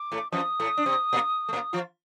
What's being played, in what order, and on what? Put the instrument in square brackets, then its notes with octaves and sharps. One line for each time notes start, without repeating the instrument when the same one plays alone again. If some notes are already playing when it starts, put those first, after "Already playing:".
Already playing: [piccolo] D6
[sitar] A2 A3
[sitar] F2 F3 [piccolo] D#6
[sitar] A2 A3
D4
C3 C4
A#2 A#3
A3
A#2 A#3
F3 F4